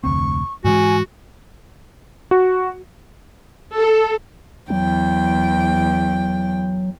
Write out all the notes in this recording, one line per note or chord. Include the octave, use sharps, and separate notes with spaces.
F1 D2 C4 C#6
G#2 E3 G#3 F#4 G#5
F#4
A4
E2 F#3 G5